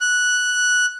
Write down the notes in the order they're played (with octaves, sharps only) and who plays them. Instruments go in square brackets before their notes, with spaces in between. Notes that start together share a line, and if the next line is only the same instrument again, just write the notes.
[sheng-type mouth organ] F#6